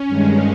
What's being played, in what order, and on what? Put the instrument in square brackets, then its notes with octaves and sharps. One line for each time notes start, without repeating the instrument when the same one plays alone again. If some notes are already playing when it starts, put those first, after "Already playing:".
Already playing: [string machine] C#4
G2 D#3 G#3